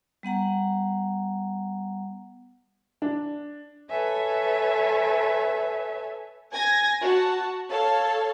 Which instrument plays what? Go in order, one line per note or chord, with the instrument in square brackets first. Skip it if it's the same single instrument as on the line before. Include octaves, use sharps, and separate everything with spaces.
[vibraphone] G3 B3 F#5 A#5
[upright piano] D4
[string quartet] A4 B4 C#5 E5 G#5
[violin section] G#5 G#6 A#6
F#4 A5
A4 C#5 F5 A5